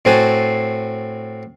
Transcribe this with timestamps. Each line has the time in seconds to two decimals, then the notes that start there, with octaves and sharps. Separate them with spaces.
0.05 A2 C4 F#4 A4 G#5